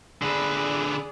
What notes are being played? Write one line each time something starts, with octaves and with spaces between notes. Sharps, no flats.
D3 G#4 B4 D5